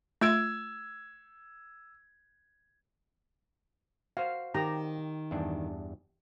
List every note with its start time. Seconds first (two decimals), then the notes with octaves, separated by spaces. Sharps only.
0.21 A3 F4 E6 G#6 D7
4.17 F#4 C5 F5
4.54 D#3 G4 A#5
5.31 E2 G2 D4